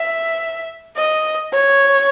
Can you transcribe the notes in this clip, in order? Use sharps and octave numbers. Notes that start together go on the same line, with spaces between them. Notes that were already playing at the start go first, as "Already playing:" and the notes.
Already playing: E5
D#5
C#5